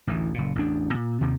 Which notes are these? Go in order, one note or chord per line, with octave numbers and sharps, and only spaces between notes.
A1 D2 E3
F#1 A#2
A1 E2 D4
A#2
D#2 C3 D#3